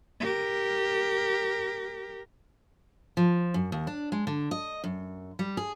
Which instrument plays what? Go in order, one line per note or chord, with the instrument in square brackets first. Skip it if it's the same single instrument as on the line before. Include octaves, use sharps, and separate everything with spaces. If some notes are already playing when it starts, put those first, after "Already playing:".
[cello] G4 A#4
[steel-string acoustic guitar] F3
F#2
D#2
D4
G#3
D3
D#5
F#2
G3
G#4